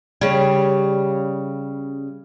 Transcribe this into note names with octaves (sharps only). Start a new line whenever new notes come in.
C#3 G3